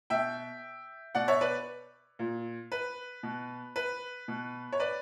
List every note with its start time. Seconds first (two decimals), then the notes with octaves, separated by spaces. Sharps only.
0.10 B2 E5 G5
1.15 B2 D5 F#5
1.28 C#5 E5
1.41 B4 D5
2.19 A#2
2.72 B4
3.23 B2
3.76 B4
4.28 B2
4.72 C#5
4.80 B4 D5